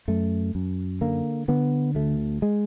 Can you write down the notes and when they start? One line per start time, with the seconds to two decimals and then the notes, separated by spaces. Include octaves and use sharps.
0.08 F#2 A3
0.55 F#2
1.01 D3 A#3
1.48 D3 B3
1.95 D2 A3
2.42 G#3